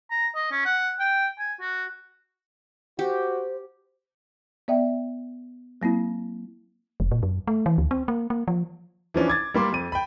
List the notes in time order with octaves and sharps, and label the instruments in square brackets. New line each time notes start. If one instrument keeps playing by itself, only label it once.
[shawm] A#5
D#5
C#4
F#5
G5
G#5
F#4
[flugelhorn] F#4 [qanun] G4 [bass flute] C5
[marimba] B3 D5 E5 G5
F#3 A#3 C4 E4
[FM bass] F1
A#2
F#2
A3
E3
D2
C4
A#3
A#3
F3
[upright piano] E3 F3 C#4 D4
D6 G#6 A6
G3 A#3 C6 D6
F2 D#7
G5 B5